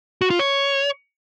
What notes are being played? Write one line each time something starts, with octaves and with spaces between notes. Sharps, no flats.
F#4
F4
C#5